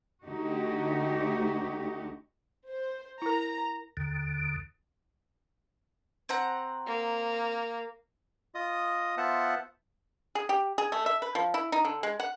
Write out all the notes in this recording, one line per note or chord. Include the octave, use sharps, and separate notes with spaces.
D2 D3 A3 D#4 F#4 G4
C5
E4 A#4 A#5
D#2 D3
C4 F#5 A#5
A#3
F4 D#5 D#6
B3 F4 C5 E5 F#5 A5
G#4
G4
G#4
A3
E5
B4
F3
E4
D#4
D3
G#3
F#5